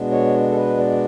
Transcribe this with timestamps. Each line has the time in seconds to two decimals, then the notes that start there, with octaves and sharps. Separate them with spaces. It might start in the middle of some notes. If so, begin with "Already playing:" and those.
Already playing: B2 G#3 B3 D4
0.12 C#5
0.50 A4
0.56 B4
0.78 D5